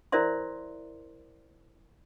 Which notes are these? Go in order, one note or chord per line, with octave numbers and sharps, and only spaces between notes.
E4 A#4 C5 D5 E5 C6